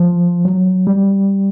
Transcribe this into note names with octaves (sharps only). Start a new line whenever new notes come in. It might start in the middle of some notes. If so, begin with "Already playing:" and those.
Already playing: F3
F#3
G3